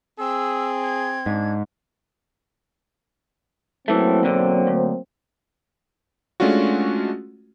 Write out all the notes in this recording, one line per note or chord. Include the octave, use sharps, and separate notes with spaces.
C4 G#4 E6
G#6
G#2 D4
E3 F#3 A3 A#3 C4
B1 E2 D3
D2
G#3 A3 C#4 D4 F4 F#4